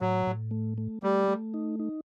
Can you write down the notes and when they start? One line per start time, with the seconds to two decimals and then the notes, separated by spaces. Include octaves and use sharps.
0.01 A2 F#3
0.27 A2
0.51 A3
0.78 A3
1.03 G3 A3
1.28 A3
1.54 D#4
1.80 D#4